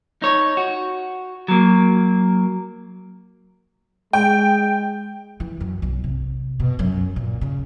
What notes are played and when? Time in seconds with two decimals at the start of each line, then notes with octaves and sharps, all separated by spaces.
0.22 D#4 C#5
0.57 F#4
1.48 F#3 A#3
4.13 G#3 G5
5.40 E3
5.60 F#2
5.82 B1
6.04 C3
6.60 B2
6.79 F#2
7.16 A#2
7.41 C#3